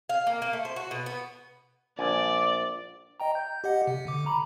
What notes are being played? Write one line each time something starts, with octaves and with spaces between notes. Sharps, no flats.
F5
A#3
A#3
A3
C5
F#4
B2
B3
A#1 D5 G#5
D#5 G5 A#5
G6
G4 D#5 F#5
C3
D3 D6
A#5 B5